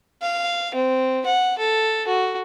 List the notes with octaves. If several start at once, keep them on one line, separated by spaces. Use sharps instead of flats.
F5
C4
F#5
A4
F#4